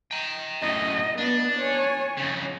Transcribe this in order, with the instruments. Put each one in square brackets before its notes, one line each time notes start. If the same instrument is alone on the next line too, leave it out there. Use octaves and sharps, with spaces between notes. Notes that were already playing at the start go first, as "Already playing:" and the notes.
[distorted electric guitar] G5 A#5
[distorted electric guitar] F#2 A2 [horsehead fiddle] D#5
[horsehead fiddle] B3 [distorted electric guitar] D4
[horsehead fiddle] C#5 G#5
[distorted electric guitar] F2 C#3